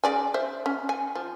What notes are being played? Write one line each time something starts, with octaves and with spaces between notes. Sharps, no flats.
C#3 D5 G#5
C5 E5
C#4
G#5
F3